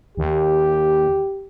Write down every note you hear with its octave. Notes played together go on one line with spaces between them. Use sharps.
D#2 G4